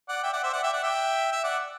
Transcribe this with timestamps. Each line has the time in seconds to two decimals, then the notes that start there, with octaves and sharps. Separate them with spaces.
0.09 D5 F#5
0.23 E5 G5
0.33 D5 F#5
0.43 C5 E5
0.53 D5 F#5
0.63 E5 G5
0.73 D5 F#5
0.83 E5 G5
1.32 E5
1.44 D5 F#5